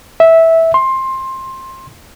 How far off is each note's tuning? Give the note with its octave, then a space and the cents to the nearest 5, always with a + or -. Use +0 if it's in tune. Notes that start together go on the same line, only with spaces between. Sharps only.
E5 -10
C6 +15